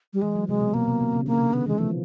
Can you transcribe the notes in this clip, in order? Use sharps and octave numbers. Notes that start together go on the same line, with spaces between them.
G3
E3 G#3
F#3
C3 G#3
B2
B2 A#3
C3
C3
C#3
D3 A#3
C3
C#3
D#3 B3
E3 G#3
F3 A3